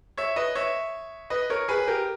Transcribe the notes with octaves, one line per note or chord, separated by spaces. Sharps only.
C#5 E5
B4 D#5
C#5 E5
B4 D#5
A#4 C#5
G#4 B4
G4 A#4